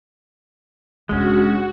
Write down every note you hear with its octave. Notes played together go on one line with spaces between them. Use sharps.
F1 G#3 C#4 D4 F#4